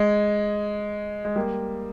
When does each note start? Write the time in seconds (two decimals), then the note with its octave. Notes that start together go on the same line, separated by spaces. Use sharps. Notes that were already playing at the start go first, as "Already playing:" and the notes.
Already playing: G#3
1.25 G#3
1.36 G3 A#3